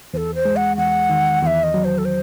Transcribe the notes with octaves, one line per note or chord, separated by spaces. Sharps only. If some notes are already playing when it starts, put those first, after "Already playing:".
E2 A4 C5
C5
G#3
F#5
E2 F#5
D#3
E2 E5 F#5
D#5
F#3
C5
A4
C5